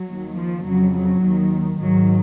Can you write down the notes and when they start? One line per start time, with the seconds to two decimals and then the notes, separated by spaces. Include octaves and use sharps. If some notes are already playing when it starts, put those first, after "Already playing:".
Already playing: F#3
0.08 D#2 D#3
0.37 F3
0.66 F2 C#3 F#3
0.94 F#3
1.23 D#2 D#3
1.81 G#2 D#3 F#3